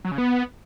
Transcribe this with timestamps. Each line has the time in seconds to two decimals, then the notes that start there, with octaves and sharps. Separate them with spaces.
0.05 F#3
0.11 C#3
0.18 B3